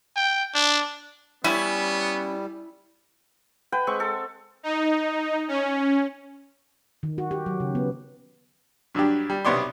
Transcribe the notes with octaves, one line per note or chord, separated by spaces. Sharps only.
G5
D4
G3 B3 C#4 E4
B4 F#5 G5
G#3 C4 C#6
A4
D#4
C#4
D#3
F#4
G4
F#3
C#3
B3
G2 F#3 D4 G4
G3
B1 C3 B3 C#5 D5 C6